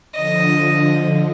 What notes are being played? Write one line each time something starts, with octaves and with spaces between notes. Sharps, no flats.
D3 F3 D#5